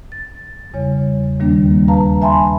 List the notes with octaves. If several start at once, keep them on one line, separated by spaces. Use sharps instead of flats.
A6
E2 C#3 G3 C#5
D#2 D#3 G3 A#3 D4
B4 F5 A5 A#5
E5 G#5 A5 B5 C6